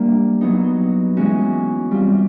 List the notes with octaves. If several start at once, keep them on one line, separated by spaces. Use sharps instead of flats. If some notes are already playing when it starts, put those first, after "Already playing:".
Already playing: G3 A#3 D4 G4
F#3 B3 D#4
E3 G#3 C#4 F#4
G3 C4 F4